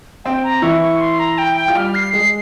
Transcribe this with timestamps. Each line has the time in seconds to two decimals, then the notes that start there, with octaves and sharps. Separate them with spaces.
0.25 C4 G5
0.43 A#5
0.62 E3 E4 C#6
0.82 C#6
1.01 C6
1.19 A#5
1.38 G5
1.57 G5
1.68 F4
1.75 G3 G4 F6
1.95 C7
2.13 G#3 G#4 C7